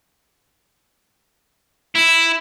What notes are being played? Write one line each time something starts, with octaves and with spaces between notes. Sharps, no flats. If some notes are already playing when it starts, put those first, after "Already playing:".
E4